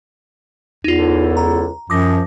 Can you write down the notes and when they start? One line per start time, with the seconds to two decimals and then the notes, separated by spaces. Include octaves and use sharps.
0.84 E2 D#4 F4
0.99 C#2 E4 A4
1.37 A#5
1.90 F#2 F3 D6 D#6 A#6